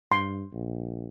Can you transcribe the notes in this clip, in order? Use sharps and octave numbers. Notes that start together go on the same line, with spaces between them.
G2 C6
A#1